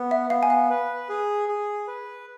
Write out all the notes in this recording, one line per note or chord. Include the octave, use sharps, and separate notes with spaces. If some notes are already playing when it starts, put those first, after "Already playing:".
Already playing: B3
E5
B3 F5
G#5
F5
B4
G#4
G#4
B4